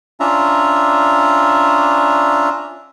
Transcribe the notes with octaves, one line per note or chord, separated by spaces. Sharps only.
C#4 D4 F4 E5 A#5